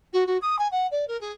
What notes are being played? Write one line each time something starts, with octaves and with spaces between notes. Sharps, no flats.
F#4
F#4
D#6
G#5
F#5
D5
A#4
G#4